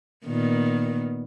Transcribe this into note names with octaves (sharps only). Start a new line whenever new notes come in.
A#2 D#3 B3